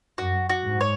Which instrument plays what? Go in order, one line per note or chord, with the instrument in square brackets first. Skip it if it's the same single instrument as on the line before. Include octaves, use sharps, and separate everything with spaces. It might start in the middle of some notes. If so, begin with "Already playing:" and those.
[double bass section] F#2 [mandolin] F#4
[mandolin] F#4
[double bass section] G#2
[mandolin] C#5